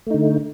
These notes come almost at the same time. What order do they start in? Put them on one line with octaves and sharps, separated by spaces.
A3 D#4 D3